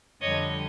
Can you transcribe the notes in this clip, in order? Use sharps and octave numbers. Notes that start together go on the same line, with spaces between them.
F2 D3 G3 C#5 D#5